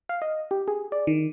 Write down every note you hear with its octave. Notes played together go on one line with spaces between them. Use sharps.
F5
D#5
G4
G#4
D5
D#3